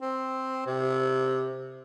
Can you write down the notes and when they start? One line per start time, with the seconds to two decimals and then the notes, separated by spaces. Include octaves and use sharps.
0.02 C4
0.66 C3